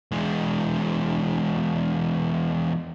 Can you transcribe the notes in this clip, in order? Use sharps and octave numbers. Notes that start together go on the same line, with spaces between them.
E2 G#3